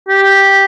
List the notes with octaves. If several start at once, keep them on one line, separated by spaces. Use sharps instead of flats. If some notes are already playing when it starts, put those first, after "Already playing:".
G4